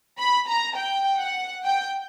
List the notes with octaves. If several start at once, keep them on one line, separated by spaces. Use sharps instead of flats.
B5
A#5
G5
F#5
G5